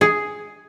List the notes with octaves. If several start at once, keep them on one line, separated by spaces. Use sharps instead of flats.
G#4